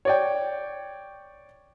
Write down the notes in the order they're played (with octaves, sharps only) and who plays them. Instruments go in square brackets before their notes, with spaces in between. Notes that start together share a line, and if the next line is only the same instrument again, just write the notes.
[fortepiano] C#5 D5 G5